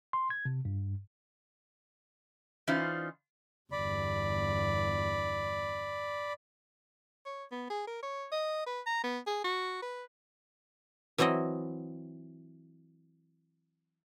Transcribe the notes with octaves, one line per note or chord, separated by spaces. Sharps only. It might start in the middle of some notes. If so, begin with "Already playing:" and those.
C6
G#6
C3
G2
E3 C#4 D#4 F4 C5 D5
G1 E2 D5 B5
C#5
B3
G#4
A#4
C#5
D#5
B4
A#5
B3
G#4
F#4
B4
E3 F#3 C4 E4 D#5